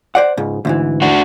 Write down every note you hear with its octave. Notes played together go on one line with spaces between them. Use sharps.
C5 D5 F#5
C#2 G#2
D2 G#2 E3
D4 F#4